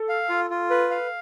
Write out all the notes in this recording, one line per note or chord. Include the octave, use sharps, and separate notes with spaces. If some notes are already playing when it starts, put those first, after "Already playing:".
Already playing: A4
F5
F4
F4
B4
F5